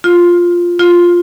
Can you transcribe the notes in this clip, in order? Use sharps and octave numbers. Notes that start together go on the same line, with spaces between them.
F4
F4